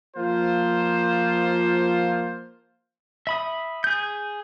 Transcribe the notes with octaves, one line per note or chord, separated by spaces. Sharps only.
F3 A#3 F4 C5
E5 B5 D#6
G#4 G6